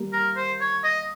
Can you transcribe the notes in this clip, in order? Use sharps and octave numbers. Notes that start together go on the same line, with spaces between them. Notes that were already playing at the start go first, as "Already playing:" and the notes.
Already playing: G3 A#3
A#4
C5
C#5
D#5